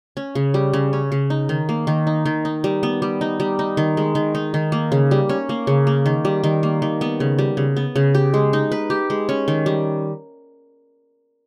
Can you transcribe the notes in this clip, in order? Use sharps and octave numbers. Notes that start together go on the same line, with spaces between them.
C#4
C#3
G3
C#3
C#4
C#3
D#4
D#3
A#3
D#3
D#4
D#3
D#4
G3
B3
G3
D#4
G3
D#4
D#3
G#3
D#3
D#4
D#3
A#3
C#3
G3
C#4
A#3
C#3
A#3
D#3
G3
D#3
A#3
D#3
B3
C#3
G3
C#3
B3
C#3
G4
G#3
D#4
B4
G4
G#3
C#4
D#3
G3